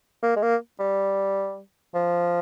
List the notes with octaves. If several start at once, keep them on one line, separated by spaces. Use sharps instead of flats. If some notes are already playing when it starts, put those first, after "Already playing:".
A#3
G#3
A#3
G3
F3